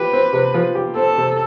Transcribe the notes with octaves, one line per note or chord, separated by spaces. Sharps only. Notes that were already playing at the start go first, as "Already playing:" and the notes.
Already playing: F3 G4 B4
C4
C3
F3
G4
C4 A4
C3